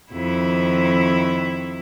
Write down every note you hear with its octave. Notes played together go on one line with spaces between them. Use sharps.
F2 D#3 E4